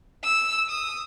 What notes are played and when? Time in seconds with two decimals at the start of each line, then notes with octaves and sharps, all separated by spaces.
0.24 E6
0.69 D#6